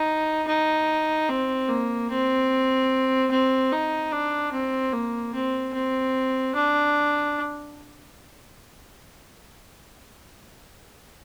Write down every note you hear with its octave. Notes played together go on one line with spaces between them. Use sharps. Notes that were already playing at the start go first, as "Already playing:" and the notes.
Already playing: D#4
D#4
C4
A#3
C4
C4
D#4
D4
C4
A#3
C4
C4
D4